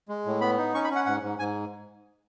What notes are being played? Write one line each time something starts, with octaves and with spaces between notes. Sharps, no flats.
G#3
A2
B3 B5
D#4
C#4 C#6
B5
C#4
F#5
G#2 F#5
G#2
G#2 G#5